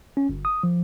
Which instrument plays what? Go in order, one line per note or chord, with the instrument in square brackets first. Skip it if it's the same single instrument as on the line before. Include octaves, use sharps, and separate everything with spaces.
[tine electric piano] C#4
G1
D#6
F3